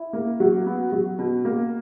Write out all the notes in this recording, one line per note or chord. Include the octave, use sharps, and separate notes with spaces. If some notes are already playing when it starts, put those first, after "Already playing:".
Already playing: E4
A#3
F#3
B3
F#3
B2
A#3